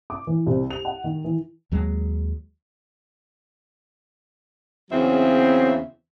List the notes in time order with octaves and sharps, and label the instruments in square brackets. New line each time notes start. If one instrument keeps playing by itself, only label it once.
[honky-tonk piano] D6
E3
C2
F7
F#5
D#3
E3
[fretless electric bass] D#2 F#3 G#3
[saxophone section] E2 C#3 F#3 C4 E5